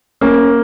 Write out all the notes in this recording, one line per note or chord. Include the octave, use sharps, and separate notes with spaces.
A#3 C#4